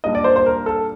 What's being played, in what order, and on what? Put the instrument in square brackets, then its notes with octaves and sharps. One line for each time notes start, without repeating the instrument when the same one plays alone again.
[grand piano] A#2 G3 D4 D#5
D5
C5
C5
A#4
A4